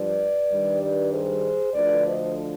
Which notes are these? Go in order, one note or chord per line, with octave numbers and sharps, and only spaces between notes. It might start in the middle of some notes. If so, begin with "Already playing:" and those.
Already playing: G2 F3 B4 D5
G2 D#3 G3
B4 D5
G#4 C5
D2 D3 F3 B4 D5
C5 D#5